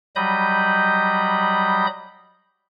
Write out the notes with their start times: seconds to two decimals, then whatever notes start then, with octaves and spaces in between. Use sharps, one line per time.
0.16 F#3 G3 D#5 B5 D#6 G6